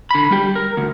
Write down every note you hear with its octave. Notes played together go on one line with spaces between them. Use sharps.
D3 B5
G3 G4
A#4
D2